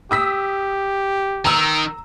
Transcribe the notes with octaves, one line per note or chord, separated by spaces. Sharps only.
G4 D#6 E6 B6
D#3 A#5 E6